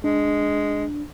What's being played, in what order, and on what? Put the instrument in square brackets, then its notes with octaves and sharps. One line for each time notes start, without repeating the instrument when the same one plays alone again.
[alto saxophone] G#3 [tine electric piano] D4